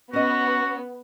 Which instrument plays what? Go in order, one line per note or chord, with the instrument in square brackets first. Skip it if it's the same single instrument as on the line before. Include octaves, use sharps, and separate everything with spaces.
[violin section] B3 [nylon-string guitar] C#4 D#5 [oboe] F#4